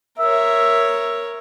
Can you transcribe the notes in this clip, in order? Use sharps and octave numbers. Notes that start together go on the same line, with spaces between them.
A#4 C#5 E5